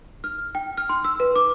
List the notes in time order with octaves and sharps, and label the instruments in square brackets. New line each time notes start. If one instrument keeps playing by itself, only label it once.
[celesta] F6
G5
F6
C6
E6
B4
D6